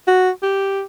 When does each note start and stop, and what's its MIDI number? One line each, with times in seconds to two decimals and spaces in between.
0.07 0.30 66
0.43 0.82 67